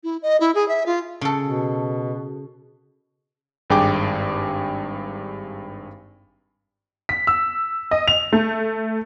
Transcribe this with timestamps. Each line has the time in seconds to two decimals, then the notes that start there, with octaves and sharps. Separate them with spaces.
0.04 E4
0.22 D#5
0.41 E4
0.55 G#4
0.68 E5
0.86 F4
1.21 C#3 A4
1.46 B2
3.70 G#1 G2 G#4 G5 D6
7.09 B6
7.27 E6
7.91 D#5
8.08 F7
8.33 A3